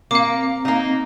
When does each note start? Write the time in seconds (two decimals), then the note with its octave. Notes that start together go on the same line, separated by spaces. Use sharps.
0.11 A#3 C4 F5 D6
0.65 A#3 D#4